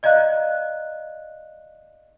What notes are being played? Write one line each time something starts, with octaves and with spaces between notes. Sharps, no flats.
D5 D#5 F5 A#5 F#6